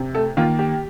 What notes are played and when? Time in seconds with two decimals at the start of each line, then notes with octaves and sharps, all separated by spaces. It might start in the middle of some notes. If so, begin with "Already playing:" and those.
Already playing: C3
0.15 A3 A4
0.37 D#3 A#3 F4
0.59 G4